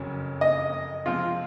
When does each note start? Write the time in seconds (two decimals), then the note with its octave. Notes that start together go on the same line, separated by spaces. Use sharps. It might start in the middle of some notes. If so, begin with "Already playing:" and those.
Already playing: F#1 F2 C#3 F#3 C#4
0.41 D#5
1.06 C3 F3 G#3 C4 F4